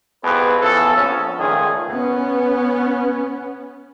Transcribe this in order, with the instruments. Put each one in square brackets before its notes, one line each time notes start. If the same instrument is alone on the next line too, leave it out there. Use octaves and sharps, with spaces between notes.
[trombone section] C2 F2 B3 G#4 B4
C#3 E3 B3 A4
A#1 C#4
C#2 A#2 D#3 F3 A3 G#4
[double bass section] B3 C#4